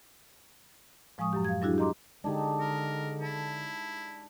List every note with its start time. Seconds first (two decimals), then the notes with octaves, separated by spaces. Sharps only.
1.18 A2 F3 G#3 G#5 C#6 D#6
1.33 F#2 F#3 G4
1.44 F5 G#6
1.61 F#3 G3 D4 E4 F#4 G#4
1.78 G4 D#5 A#5 C6 D6
2.24 D3 G#3 D4 D#4 G4 G#4
2.60 A#4
3.21 E4 A5